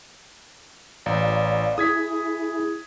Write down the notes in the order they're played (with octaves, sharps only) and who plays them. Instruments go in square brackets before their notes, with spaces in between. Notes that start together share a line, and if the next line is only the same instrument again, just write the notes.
[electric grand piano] A1 [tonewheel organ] D5 F5
[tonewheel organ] E4 G#4 [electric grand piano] D#6 G#6 B6